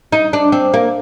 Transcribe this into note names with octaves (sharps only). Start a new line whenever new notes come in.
D#4
D4
C4
A#3